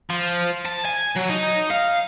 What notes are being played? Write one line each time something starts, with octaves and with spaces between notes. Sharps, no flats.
F3
A5
G#5
F#3
D#4
F5